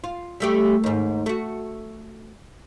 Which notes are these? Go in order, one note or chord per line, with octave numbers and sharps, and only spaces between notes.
F4
G3 A3 G4
D#2 G#2
A3 F#4